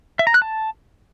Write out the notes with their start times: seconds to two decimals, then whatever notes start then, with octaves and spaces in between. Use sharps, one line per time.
0.19 E5
0.27 A#5
0.34 F#6
0.42 A5